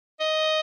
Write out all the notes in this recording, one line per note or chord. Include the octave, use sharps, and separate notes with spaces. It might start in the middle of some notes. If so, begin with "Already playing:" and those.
D#5